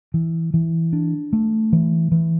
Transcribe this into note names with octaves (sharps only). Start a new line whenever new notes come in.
E3
E3
D4
A3
E3
E3